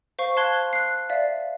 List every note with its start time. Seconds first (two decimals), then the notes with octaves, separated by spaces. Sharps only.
0.19 C5 F5 C#6
0.37 F5 A5 C6 F#6 G#6 G7
0.73 F#6 C7
1.10 D5 E5 F5